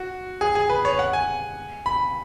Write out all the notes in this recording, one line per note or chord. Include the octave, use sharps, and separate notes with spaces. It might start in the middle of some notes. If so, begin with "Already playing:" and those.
Already playing: F#4
G#4
G#4
B4
C#5
F#5
G#5
B5